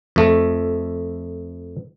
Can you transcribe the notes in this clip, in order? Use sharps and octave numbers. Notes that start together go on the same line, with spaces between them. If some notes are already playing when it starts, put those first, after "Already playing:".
F2 A3